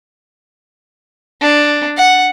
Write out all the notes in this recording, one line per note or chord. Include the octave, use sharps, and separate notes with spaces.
D4
F#5